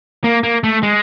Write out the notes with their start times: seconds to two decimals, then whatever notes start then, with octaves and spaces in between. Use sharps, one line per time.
0.24 A#3
0.44 A#3
0.64 A3
0.83 G#3